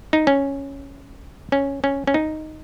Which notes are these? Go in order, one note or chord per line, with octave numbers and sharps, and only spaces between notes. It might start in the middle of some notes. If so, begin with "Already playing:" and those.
D#4
C#4
C#4
C#4
C#4
D#4